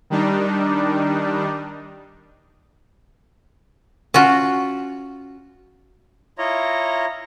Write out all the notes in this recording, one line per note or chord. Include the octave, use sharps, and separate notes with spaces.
D#3 G3 D4 D#4
C#4 F4 F#4
E4 F4 C#5 D#5 A#5